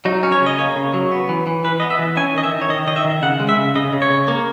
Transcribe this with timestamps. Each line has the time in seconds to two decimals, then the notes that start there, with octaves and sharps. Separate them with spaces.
0.05 F#3 D#4
0.23 C#4
0.32 C#5
0.41 C#3
0.46 D#5
0.58 A#3 C#5
0.76 C#3
0.94 F#3
1.11 B3
1.29 E3
1.47 E3
1.64 E3 B4
1.80 B3 D#5
1.90 E5
1.99 E3
2.17 C#4 G#5
2.35 D#3 D#5
2.44 E5
2.52 D#3
2.61 C#5
2.69 D#3 D#5
2.87 D#3 D#5
2.96 E5
3.05 D#3
3.22 C#3 F#5
3.40 G#3
3.49 E5
3.57 C#3
3.75 C#3 D#5
3.93 C#3
4.02 C#5
4.11 C#3
4.28 A#3